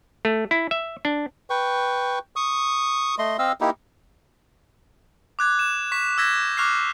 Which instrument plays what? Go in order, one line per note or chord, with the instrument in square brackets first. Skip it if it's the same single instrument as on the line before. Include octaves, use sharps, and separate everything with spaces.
[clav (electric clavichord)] A3
E4
E5
D4
[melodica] B4 G5 C#6
C#6 D#6
A3 D#5 C6
C4 D#5 F5 E6
A#3 D#4 E4 G4
[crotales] D6 F#6 G#6
E7
C#6 B6 E7
E6 G6 G#6 A#6 B6 E7
C#6 D6 F6 F#6 C7